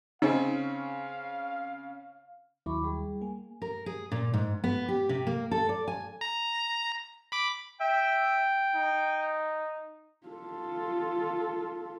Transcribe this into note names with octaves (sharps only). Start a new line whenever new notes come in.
C#3 C4 C#4 D#4 F5
D#2 F#3 E4 B5 C#6 D6
G3 G#4
A#3 G#5
A#4
G#4
A#2
G#2
B3
G4
C3
A#3
A4
D5
G#5
A#5
B5 D6
E5 G5
D#4
F4 A4